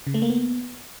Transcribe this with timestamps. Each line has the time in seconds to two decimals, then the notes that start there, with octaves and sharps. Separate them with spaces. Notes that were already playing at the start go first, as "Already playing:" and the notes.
0.07 C#3
0.14 A3
0.22 A#3
0.30 B3